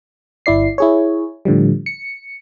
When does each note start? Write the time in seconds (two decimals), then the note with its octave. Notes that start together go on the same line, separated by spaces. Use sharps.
0.46 G1 E4 D5 C7
0.78 E4 G#4 C#5
1.45 A2 D3 F3 G3
1.86 C#7